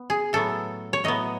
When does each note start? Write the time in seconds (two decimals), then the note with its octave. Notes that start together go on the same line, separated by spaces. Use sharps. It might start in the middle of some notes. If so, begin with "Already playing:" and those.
Already playing: B3
0.10 G#4
0.33 A2 F#3 B3 A4
0.93 C#5
1.04 A2 F#3 B3 D#5